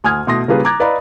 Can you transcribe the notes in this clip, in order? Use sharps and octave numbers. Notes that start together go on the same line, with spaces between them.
D2 G#5 D#6 F6 G#6
B2 A3 C6 D#6 A#6
C#3 G3 A#3 F4 G#4 B4
A#5 D6 F#6 G#6 A6
B4 D5 D#5 F5 A#5 B5